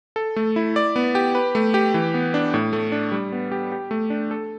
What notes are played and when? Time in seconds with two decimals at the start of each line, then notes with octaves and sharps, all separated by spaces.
0.16 A4
0.36 A3
0.56 E4
0.76 D5
0.96 B3
1.15 G4
1.35 B4
1.55 A3
1.74 G4
1.94 E3
2.14 B3
2.34 D4
2.54 A2
2.73 A3
2.92 D4
3.12 G3
3.32 B3
3.52 G4
3.72 G4
3.91 A3
4.10 D4
4.31 A4